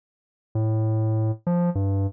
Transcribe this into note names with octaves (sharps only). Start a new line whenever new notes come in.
A2
F3
G2